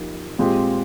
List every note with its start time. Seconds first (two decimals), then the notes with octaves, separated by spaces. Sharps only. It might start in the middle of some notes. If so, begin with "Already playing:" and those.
Already playing: F3 A#3 D#4 G4
0.39 A#2 G#3 C4 G4